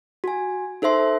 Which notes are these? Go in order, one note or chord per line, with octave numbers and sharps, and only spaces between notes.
F#4 G#5
D#4 A4 C5 E5 C6